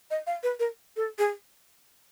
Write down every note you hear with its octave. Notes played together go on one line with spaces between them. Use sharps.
D#5
F5
B4
A#4
A4
G#4